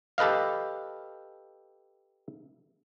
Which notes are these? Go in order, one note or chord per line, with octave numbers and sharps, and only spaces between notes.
G4 A4 B4 D#5 F5